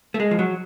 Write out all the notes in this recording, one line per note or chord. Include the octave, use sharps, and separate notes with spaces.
A3
G#3
F3
F#3